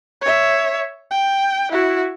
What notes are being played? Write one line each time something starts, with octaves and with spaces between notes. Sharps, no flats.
C#5 E5
G5
E4 F#4